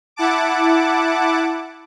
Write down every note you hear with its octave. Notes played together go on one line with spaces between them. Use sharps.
E4 F#5 A5 D6